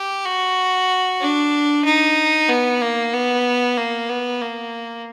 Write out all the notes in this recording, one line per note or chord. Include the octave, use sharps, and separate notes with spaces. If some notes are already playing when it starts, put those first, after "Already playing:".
Already playing: G4
F#4
D4
D#4
B3
A#3
B3
A#3
B3
A#3